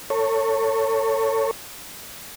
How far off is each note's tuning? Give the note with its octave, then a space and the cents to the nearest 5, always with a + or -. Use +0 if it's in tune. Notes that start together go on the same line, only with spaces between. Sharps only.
A4 +30 C#5 +0